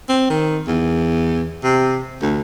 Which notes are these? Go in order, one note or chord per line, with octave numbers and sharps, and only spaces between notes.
C4
D#3
E2
C3
D2